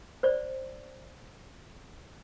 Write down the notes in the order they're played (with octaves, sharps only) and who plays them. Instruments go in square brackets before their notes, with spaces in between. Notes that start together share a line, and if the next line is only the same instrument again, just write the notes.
[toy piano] C5 D5